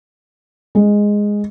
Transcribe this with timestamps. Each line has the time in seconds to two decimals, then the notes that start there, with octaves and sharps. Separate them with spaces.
0.75 G#3